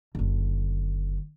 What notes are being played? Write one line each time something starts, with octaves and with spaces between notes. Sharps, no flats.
F#1 D3